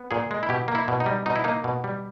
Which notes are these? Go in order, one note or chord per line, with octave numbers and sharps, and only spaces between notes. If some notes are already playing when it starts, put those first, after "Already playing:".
Already playing: B3
A#2 G#4
G#3
E4
B2 G4
A#3
E4
B2
D#4
G3
B2 D#4
E4
A#3 D#4
B2
G3